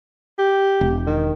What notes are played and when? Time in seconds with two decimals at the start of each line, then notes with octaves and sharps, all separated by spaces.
0.38 G4
0.81 E1
1.06 D#3